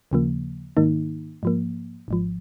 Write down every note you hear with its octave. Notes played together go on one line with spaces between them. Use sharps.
D#2 C#3 F3 A#3
G#2 D#3 A#3 D#4
G#2 F3 A#3
G#1 G#2 F3